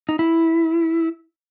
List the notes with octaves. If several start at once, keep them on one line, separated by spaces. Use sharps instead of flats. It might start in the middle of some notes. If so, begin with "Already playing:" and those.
D#4
E4